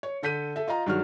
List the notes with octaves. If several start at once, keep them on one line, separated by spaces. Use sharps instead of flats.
C#5
D3 A4 G6 B6 D#7
A4 E5
F4 D#5 F5 A#5
G2 D#3 F#3 G#3 F#4 F6